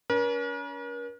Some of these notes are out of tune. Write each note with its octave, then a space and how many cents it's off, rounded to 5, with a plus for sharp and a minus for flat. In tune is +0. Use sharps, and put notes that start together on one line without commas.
C#4 +35 A#4 +45